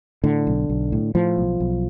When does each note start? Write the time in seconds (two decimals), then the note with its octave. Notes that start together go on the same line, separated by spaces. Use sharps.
0.24 A2 D3
0.47 B1
0.69 B1
0.92 A2
1.15 A2 F3
1.37 B1
1.60 B1